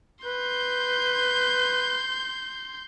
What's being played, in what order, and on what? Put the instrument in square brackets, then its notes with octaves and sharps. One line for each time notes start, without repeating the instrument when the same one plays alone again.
[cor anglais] B4 [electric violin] C6 G6